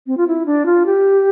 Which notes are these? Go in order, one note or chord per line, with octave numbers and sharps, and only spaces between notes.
C4
F4
E4
D4
F4
G4